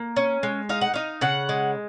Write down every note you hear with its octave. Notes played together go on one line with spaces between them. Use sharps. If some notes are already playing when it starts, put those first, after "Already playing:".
Already playing: A#3
C#4
G#3
D#4 F5
F#5
D#4 F5
C#3 F#5
G#3